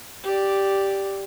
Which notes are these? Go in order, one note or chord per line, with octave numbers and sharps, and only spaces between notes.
G4 D5